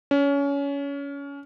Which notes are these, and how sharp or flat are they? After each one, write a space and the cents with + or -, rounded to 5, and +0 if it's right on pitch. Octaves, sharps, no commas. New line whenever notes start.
C#4 +25